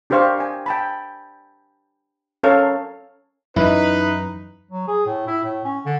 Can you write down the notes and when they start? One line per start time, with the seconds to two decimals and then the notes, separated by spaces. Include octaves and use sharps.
0.10 D4 G4 A#4 C5 F5 C#6
0.38 G5 G#5
0.66 G5 A5 B5
2.43 C#4 A4 A#4 C#5 F5 A5
3.56 F#2 E3 D#4 E4 B4
4.71 F#3
4.88 G#4
5.06 A2
5.27 E4
5.44 A2
5.65 C#4
5.86 D3